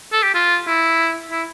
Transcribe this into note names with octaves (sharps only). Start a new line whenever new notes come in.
A4
G4
F4
E4
E4